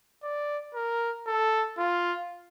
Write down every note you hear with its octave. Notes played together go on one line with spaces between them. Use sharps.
D5
A#4
A4
F4